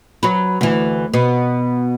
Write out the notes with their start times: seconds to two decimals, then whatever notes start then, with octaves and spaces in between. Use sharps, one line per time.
0.23 F#3 B4
0.61 D2 E3
1.14 B2 B3